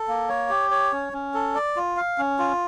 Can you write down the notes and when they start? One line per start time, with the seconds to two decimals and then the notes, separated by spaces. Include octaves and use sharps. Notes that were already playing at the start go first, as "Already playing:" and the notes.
Already playing: A4
0.08 A#3
0.29 C#5
0.49 G4
0.71 C#5
0.92 C#4
1.13 C#4
1.34 A4
1.55 D5
1.76 F4
1.97 F5
2.18 C#4
2.39 F4